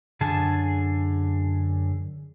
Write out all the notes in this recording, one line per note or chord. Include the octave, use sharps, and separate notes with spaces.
F#2 D3 G#4 A5